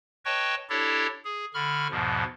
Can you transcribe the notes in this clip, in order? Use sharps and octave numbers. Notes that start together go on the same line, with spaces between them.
B4 C#5 D#5 G5 A5 C#6
D4 E4 G4 A4 C#5 D5
G#4
D3 B5 C#6 F6
E2 G#2 B2 F3